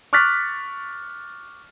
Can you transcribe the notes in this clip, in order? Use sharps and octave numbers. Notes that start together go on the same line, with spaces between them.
C#6 D6 F6 F#6 A6 B6